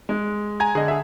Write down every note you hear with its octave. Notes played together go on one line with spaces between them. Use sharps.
G#3
G#5 A#5 G#6
D3 G#4 D#5
G#4 E5